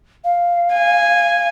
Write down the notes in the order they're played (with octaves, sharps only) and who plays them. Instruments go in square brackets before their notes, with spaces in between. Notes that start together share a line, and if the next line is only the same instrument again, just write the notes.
[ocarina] F5
[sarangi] G#5